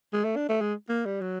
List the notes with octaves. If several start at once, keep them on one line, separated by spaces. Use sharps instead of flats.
G#3
A3
D4
A3
G#3
A#3
G3
F#3